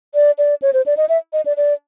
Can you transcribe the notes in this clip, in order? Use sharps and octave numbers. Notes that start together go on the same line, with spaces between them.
D5
D5
C#5
C5
D5
D#5
E5
D#5
D5
D5